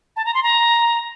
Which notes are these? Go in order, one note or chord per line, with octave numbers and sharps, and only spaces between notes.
A5
A#5
C6
A#5